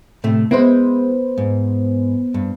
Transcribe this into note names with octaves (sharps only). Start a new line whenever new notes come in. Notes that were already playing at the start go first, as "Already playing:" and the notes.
A2 C3 A3
G#3 B3 E4 B4 C5
G#2
G2